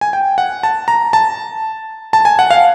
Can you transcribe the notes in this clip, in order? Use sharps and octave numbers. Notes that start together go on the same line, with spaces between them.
G#5
G5
F#5
A5
A#5
A5
A5
G#5
F#5
F5